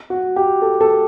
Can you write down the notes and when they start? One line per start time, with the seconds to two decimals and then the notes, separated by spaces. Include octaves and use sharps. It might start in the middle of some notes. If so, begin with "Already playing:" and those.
0.10 F#4
0.36 G4
0.62 A4
0.81 A4